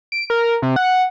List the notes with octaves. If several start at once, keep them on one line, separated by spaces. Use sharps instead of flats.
D7
A#4
C3
F#5